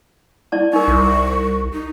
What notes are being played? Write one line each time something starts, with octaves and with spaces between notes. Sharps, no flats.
E4 D5 A5
D#4 A#4 C#6
C2
D#4